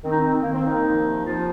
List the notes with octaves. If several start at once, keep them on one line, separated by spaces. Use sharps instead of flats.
D#3 C4
D#4
C4
D#3
D#3 A#3
C4
D#3 A#3 D#4
F3
C3
F3 A#3 F4